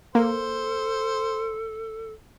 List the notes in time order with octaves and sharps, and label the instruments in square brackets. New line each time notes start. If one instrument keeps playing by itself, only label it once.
[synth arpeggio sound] A#3 [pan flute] A4 [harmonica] C5